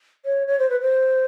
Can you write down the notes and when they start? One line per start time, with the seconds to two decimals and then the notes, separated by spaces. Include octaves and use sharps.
0.25 C#5
0.47 C#5
0.58 C5
0.69 B4
0.80 C5